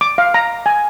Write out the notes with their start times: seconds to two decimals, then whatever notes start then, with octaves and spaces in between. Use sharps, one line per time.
0.01 D6
0.18 F5
0.34 A#5
0.66 G#5